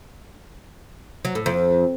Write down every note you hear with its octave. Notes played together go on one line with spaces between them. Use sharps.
F#3
A2
F2